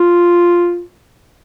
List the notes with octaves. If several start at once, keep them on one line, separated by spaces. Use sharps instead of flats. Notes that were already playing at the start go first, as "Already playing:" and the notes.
Already playing: F4